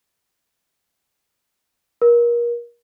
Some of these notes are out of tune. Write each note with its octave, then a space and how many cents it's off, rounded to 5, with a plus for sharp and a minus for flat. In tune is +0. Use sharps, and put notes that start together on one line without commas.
A#4 +30